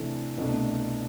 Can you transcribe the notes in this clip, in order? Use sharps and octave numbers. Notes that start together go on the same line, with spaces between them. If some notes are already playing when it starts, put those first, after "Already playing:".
Already playing: C3 E3 A3 D4
C2 B2 A3 D4